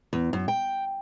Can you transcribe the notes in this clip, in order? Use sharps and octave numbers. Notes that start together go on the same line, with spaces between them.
E2
F#2
G5